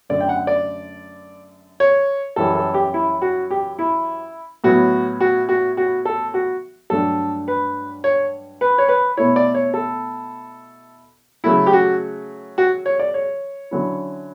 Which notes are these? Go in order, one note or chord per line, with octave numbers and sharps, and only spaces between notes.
F#2 D3 A3 D5
G5
F#5
D5
C#5
F#2 E3 G3 C#4 E4 A4
A4
G4
E4
F#4
G4
E4
A2 F#3 B3 F#4
F#4
F#4
F#4
A4
F#4
G2 F#3 A3 D4 A4
B4
C#5
B4
C#5
B4
B2 A3 E4 C#5
D5
C#5
A4
C#3 F#3 A3 E4
G4
F#4
F#4
C#5
D5
C#5
D3 F#3 C#4 E4